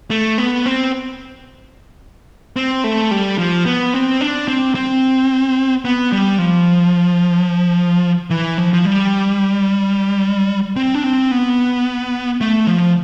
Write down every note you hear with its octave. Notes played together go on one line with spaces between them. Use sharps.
A3
B3
C4
C4
A3
G3
F3
B3
C4
D4
C4
C4
B3
G3
F3
E3
F3
F3
G3
C4
D4
C4
B3
A3
F3